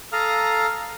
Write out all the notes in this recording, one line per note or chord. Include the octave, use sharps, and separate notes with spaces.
A4 F5 A#5 D#6 F6